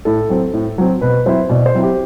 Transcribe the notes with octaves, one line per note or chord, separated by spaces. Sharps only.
A2 A4
F#3 C4
A2
F#3 C4
B2 B4
F#3 C4 E4 C5
B2 D5
C5
F#3 C4 E4
G4